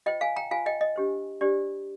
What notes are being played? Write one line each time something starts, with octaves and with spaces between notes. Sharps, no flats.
F4 C5 D#5 G5
F5 G#5
G5 A#5
F4 C5 F5 G#5
D#5 G5
D#5
D4 G4 C5
D4 G4 C5 D5